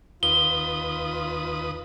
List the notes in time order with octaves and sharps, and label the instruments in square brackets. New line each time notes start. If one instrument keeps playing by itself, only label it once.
[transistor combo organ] D#2 B4 D#6 [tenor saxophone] F4 [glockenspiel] G7